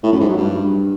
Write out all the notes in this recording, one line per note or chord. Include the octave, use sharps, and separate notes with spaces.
A2
F#2
G#2
F#3
G2